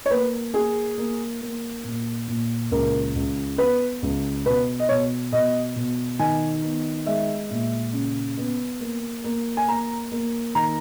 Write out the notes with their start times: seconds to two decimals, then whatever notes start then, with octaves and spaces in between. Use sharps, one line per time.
0.06 C#5
0.10 A#3 B4
0.54 A#3 G#4
0.98 A#3
1.41 A#3
1.84 A#2
2.28 A#2
2.71 C#2 A#4
3.16 C#2
3.58 B3 B4
4.02 C#2
4.46 B2 B4
4.79 D#5
4.89 B2 C#5
5.32 B2 D#5
5.76 B2
6.19 D#3 G#5
6.63 B3
7.06 G#3 E5
7.51 A#2
7.93 C#3
8.37 B3
8.80 A#3
9.24 A#3
9.57 G#5
9.68 A#3 A#5
10.12 A#3
10.55 D#3 A#5